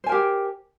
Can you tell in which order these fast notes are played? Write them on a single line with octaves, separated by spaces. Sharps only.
C5 G#5 A#4 G4